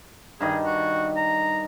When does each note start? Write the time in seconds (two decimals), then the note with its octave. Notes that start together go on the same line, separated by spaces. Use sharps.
0.40 G2 D#3 G#4 D#5
0.63 F#4
1.17 A#5